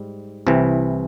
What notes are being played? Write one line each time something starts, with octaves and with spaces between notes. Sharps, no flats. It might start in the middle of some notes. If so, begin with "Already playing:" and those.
Already playing: G#2 G3
C2 C3 E3